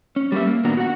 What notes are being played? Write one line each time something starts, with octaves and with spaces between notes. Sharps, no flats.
C#4
G3 A#3 F#4 B4 E5
A#3
A#2 D#3 B3 D4 F#4 A#4
F#4 F#5